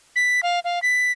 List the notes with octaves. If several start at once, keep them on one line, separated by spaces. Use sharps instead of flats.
B6
F5
F5
B6